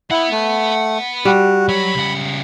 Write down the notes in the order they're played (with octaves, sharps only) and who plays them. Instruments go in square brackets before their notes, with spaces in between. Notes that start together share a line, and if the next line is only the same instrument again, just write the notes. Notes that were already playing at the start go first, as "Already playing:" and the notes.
[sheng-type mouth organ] E4 [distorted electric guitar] F#5 B5
[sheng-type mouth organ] A3
[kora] G3 [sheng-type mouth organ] F#4
[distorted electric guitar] F#3 C#5 [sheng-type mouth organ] B5
[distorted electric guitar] C#2 F#5